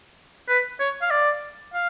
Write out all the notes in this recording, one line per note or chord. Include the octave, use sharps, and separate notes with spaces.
B4
C#5
F5
D5
F5